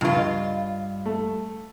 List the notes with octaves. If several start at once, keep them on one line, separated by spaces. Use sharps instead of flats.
C#2 G2 F3 F4
D#5
A3